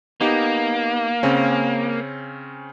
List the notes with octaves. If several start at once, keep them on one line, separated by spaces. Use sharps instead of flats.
A#3 B3 D#4 G4
C#3 C4 C#4